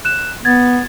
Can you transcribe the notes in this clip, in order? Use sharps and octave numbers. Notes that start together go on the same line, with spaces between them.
F#6 E7
B3 G#6 A6